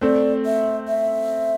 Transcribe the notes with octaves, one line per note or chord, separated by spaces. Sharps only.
A3 C4 D5
E5
E5